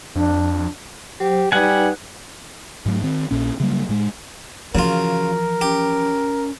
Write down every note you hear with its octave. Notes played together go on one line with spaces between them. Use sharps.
F2 D4
F#3 G4 C5
G3 D#4 B4 F#5 G#5
G#2 F#3 A3
D#3 C4
A#1 A#2 C#4
C#3 F#3 G3 A#3
A2 G#3
C#3 E3 F3 F4 F#4 A#4
C#4 G4